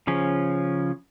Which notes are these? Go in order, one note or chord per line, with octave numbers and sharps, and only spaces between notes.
C#3 F3 C#4